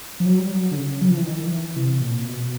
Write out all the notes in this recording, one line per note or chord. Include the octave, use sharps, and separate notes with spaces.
F3
F#3
G3
F#3
D3
C#3
F#3
F3
E3
D#3
F3
E3
C3
A#2
B2